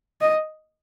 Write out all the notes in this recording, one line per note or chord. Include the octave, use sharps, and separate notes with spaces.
D#5